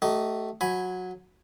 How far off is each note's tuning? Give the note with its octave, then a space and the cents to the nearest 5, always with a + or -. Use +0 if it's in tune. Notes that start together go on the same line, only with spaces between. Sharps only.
A3 +0 D#4 +0 G4 -45
F#3 -15 G#5 +0 B5 +0